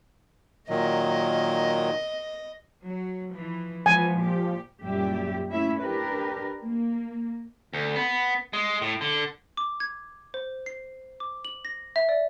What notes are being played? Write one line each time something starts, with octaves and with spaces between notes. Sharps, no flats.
A#2 D#3 F#3 D#5
F#3
E3 F3
E3 F3 G#3 B3 G#5
A#2 G4
F#2 A#2 G3 G4 E5
A3 C#4 E4 E5
D4 G4 A#4 B4
A#3
D2
B3
G#3
A2
D3
D6
G#6
C5
C7
D6
F#7
A#6
E5
D5